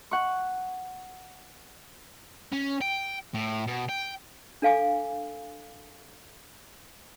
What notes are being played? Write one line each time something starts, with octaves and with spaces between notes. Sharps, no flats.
F#5 C#6
C#4
G5
A2
B2
G5
D4 A4 F5 G#5 D6